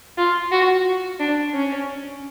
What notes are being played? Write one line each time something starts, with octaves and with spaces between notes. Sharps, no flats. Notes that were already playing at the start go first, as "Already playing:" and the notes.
F4
F#4
D4
C#4